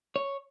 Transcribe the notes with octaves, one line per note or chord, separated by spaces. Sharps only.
C#5